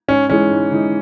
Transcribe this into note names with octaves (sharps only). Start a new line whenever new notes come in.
G#2 C#4
E3 G#3 C#4 D#4
G#2
E3 G#3 D#4